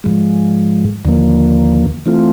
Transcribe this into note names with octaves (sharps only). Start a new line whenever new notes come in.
G#2 F3 G#3
D#2 D3 F3 A#3
E3 A3 C4 F4